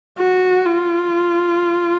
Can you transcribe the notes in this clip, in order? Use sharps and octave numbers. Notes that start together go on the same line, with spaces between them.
F#4
F4